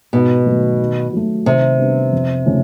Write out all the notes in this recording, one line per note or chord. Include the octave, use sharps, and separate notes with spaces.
G#2 B2
D#3 F#3 A3
D#3
F#3 A3
C3 D#3
G3 B3 D4
F2
C#3 F3 A3 C#4